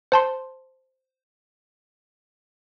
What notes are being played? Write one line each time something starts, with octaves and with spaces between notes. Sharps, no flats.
C5 A5 C6